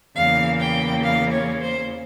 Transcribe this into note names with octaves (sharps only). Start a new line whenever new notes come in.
E2 C#3 E3 A#3 F5
G5
F5
C#5
C5